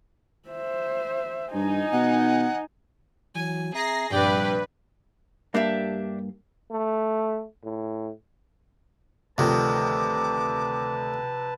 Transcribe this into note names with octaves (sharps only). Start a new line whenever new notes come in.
C5 E5
G2 D#4 G#5
B2 F#5
E3 F#3 G#5
C4 G#4 E5 A#5 A#6 C7
A#1 G2 C3 B4 D5 G5
G2 A#3 D4 G4 E5
A3
A2
D2 C3 D#3 F3 B4 A5 D6